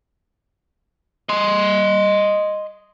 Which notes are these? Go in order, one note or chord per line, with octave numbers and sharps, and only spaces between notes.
D#5 C6